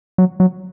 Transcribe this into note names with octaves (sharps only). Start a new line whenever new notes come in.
F#3
F#3